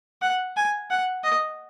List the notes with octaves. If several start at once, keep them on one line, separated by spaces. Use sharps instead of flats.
F#5
G#5
F#5
D#5